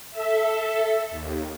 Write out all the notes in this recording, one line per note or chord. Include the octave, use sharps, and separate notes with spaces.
A4 E5
D#2